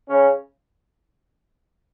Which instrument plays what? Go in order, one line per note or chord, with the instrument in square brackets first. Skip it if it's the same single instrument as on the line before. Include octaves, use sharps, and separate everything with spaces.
[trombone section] C#3 C#4